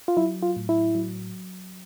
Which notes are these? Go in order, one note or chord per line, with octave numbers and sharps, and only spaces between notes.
F4
F#3 E4
F4
A2
E4
F#3